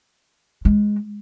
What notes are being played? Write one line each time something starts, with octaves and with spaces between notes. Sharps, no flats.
G#3